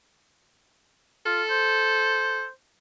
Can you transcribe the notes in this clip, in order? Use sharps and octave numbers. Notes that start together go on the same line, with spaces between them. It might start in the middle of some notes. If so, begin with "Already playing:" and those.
F4 A4
C5